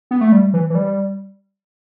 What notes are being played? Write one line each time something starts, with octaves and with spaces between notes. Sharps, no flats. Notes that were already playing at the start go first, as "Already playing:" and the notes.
B3
A3
G3
E3
E3
G3